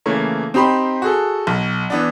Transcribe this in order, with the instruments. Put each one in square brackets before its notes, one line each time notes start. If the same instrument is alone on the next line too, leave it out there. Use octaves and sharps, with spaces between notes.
[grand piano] C#3 E3 A3 A#3
C4 D#4 G4 B5 C6
F#4 G#4 A4
B1
E3 B3 D4